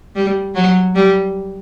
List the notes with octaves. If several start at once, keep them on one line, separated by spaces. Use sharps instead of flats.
G3
F#3
G3